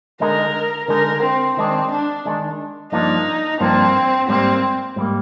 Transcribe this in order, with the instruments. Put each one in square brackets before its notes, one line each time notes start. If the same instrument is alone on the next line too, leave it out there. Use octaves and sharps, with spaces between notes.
[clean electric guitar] D3 G#3 D#4 [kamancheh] A#4
[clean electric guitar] D3 G#3 D#4 [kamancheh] A#4
[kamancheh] C4
[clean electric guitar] D#3 G#3 D4 [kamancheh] C4
[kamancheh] D4
[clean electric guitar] D#3 G#3 D4
[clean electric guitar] G2 F3 A#3 D4 [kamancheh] D#4
[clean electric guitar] G2 F3 A#3 D4 [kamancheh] C4
[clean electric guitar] G#2 G3 A#3 [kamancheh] C4
[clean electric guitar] G#2 G3 A#3